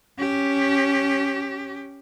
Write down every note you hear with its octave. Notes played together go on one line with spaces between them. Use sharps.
C#4 G4